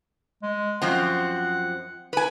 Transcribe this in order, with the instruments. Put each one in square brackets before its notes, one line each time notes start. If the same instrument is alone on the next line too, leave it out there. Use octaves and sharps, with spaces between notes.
[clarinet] G#3
[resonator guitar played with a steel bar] F#2 F3 C4 [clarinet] F#5
[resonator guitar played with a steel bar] B4 G#5